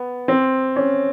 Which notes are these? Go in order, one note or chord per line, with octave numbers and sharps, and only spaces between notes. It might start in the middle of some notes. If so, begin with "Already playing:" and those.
Already playing: B3
C4
C#4